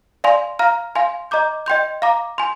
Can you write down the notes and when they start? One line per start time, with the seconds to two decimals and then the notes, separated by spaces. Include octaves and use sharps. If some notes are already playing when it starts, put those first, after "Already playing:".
0.24 D5 F5 G#5 C6
0.59 F5 A#5 F6
0.95 F5 G#5 C6
1.31 D#5 A#5 D6 G6
1.66 D#5 G5 C6 G6
2.02 F5 A#5 D6
2.38 G#5 C6